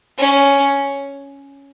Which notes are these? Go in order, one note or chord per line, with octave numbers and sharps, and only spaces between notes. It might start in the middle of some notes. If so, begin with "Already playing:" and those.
C#4